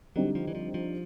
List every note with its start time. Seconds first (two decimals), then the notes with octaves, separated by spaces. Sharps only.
0.16 D3 F#3 G3 C4 D#4 G4
0.35 F3
0.48 E3
0.55 F3
0.74 F3